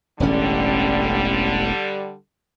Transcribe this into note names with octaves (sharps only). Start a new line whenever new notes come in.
E1 A1 D3 G3 C#4